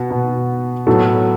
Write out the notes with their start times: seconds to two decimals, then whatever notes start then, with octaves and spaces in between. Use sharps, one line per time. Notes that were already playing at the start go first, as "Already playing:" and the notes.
Already playing: B2 B3
0.10 B2 B3
0.87 A2 F#3 B3 A4